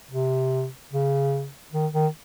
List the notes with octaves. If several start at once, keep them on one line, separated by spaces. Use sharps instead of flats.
C3
C#3
D#3
D#3